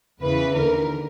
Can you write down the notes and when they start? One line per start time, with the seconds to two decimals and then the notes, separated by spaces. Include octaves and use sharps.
0.22 E2 C#3 E3 B4
0.56 D#2 D3 A#4